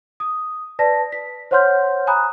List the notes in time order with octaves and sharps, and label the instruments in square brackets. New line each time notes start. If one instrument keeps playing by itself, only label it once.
[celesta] D#6
B4 D5 A5 A#6 B6
B6
C5 C#5 F#5 C6 F6 G6
G#5 A#5 B5 D#6 F#6